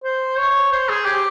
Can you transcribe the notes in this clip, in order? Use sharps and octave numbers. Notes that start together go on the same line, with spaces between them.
C5
C#5
C5
G#4
G4